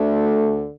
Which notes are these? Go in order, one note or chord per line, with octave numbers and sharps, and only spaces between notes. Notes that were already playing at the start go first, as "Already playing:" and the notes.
Already playing: D2 D3 A3